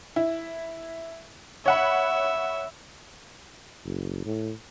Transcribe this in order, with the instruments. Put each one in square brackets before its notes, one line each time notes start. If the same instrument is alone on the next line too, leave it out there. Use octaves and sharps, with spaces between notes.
[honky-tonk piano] E4
[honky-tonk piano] C#5 F#5 B5 [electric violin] E5
[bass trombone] F#1
A2